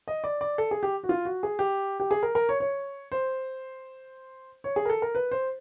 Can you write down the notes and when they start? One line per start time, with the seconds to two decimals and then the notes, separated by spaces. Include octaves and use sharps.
0.08 D#5
0.24 D5
0.41 D5
0.58 A4
0.71 G#4
0.83 G4
1.03 F#4
1.09 F4
1.25 F#4
1.43 G#4
1.59 G4
2.00 G4
2.11 G#4
2.23 A#4
2.35 A#4
2.49 C#5
2.60 C#5
3.12 C5
4.64 C#5
4.76 G#4
4.86 A#4
4.90 A4
5.02 A#4
5.15 B4
5.31 C5